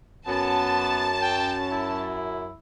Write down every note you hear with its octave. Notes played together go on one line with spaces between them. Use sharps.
F#2 B3 A5
G5
E4